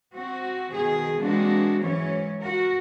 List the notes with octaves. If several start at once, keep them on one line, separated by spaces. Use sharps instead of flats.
C4 F#4
B2 D#3 G#4
E3 G#3 A#3 C4 D4 F#4
G#2 E3 F#3 C#4 C#5
F#4 A#4